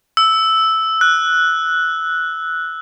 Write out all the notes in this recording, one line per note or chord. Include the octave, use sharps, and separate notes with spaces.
E6
F#6